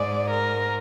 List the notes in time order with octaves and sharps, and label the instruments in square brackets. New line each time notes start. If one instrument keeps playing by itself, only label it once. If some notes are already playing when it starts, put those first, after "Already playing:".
Already playing: [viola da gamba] G#2 G#3 [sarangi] D5
[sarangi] A#4